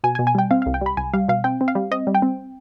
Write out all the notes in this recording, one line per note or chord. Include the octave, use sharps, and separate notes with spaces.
B2 G#5
G#5
B2
G#5
G3 G5
C4 F5
F5
C2
G5
G3 B5
C2 G#5
G3 F5
B2 F5
C4 G5
C4
F5
G3
C4 D#5
G3
G5
C4